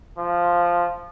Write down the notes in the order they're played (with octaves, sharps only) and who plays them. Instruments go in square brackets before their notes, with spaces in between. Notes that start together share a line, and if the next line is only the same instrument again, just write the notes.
[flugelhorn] F3